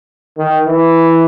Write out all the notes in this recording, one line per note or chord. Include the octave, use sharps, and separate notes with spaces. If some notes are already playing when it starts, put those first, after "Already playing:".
D#3
E3